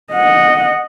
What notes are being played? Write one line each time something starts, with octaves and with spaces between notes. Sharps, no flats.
D#5 F#5